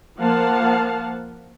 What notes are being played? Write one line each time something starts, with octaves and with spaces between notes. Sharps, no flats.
F3 A#3 F5 F#5 A5